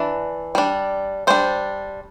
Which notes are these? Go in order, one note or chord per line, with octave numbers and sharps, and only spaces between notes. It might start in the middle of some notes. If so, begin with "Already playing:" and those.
Already playing: E3 D4
G3 D4
G3 D4 C5